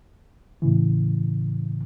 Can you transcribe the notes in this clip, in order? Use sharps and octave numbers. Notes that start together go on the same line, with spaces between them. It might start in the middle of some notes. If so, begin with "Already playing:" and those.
A2 C#3 E3